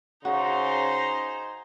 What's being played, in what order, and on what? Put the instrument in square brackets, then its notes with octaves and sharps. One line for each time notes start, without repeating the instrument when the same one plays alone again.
[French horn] C#3 [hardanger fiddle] D#4 C5 [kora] F#4 [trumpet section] G#5 A#5 C6